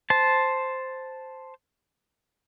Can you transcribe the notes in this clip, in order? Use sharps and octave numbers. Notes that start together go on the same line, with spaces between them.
C5 A5